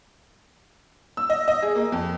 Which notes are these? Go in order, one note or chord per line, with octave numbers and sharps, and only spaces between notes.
E6
D#5
D#5
G#4
A#3
F2